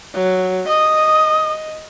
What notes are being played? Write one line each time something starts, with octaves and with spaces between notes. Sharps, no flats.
F#3
D#5 D#6